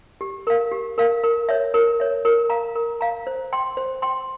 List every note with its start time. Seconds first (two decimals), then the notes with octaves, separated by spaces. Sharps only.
0.21 G4
0.47 A#4 F5
0.72 G4
0.98 A#4 F5
1.23 A#4
1.49 C#5 E5
1.74 A#4
2.00 C#5 E5
2.25 A#4
2.50 F5 A#5
2.75 A#4
3.01 F5 A#5
3.27 C5
3.53 G5 C6
3.77 C5
4.02 G5 C6